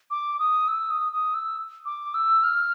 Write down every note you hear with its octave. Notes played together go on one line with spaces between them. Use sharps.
D6
D#6
E6
D#6
D#6
E6
D6
E6
F6